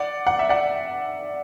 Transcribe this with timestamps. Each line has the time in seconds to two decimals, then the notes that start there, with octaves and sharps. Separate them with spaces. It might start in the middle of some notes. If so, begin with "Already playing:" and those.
Already playing: D5 F#5
0.27 F#5
0.39 E5
0.49 D5 F#5